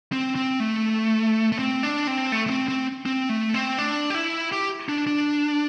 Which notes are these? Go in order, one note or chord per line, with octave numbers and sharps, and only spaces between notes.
C4
C4
A3
A3
C4
D4
C4
A3
A3
C4
C4
C4
A3
C4
D4
G4
E4
G4
D4
D4